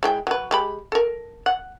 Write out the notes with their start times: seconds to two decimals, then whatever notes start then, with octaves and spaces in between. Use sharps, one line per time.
0.03 G#3 E4 G5
0.27 F#3 B4
0.51 G#3 G4 B5
0.92 A4 A#4
1.46 F#5